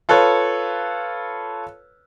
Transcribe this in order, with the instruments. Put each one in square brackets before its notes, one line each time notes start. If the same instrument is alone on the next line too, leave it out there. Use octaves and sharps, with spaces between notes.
[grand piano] F4 A4 B4 C#5